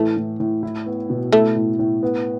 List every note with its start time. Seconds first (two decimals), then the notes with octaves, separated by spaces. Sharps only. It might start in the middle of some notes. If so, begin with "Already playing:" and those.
Already playing: A2 E3 A3
0.17 A2
0.40 A2
0.63 E4
0.86 B3
1.10 B2
1.32 A3 E4
1.56 A2
1.79 A2
2.03 B3